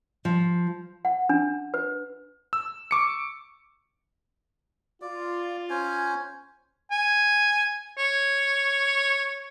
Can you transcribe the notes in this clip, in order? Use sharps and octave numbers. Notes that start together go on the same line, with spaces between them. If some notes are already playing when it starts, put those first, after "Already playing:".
F3
F#5
D4
B4
E6
C#6 D6 C#7
F4 D5
C#4 C5 G#5
G#5
C#5